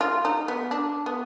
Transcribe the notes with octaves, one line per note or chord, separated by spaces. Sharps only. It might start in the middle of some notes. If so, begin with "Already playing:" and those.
F4
D#4
B3
D4
B3